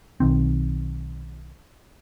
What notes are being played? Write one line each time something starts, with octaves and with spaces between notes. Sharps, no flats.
B1 D#3 C4